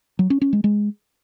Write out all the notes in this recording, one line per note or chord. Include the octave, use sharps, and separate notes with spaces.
F#3
C#4
C#4
G#3
G#3